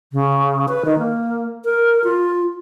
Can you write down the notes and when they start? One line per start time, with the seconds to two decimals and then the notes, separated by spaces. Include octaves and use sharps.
0.13 C#3
0.68 B4
0.85 D#3
0.98 A#3
1.65 A#4
2.04 F4